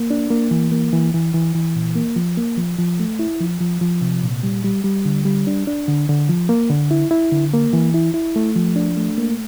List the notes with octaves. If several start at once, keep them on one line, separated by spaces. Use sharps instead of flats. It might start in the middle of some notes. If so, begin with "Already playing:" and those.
Already playing: A#3
D4
A#3
E3
A#3
E3
E3
E3
E3
A#2
A#3
F3
A#3
F3
F3
A3
E4
F3
F3
F3
C3
A#2
G3
G3
G3
D3
G3
D4
D4
D3
D3
F3
A#3
D3
E4
E4
D3
A#3
E3
E4
E4
A3
F3
D4
A3
A#3